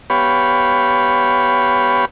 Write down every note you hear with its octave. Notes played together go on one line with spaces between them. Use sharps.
B3 G4 B4 C#5 F5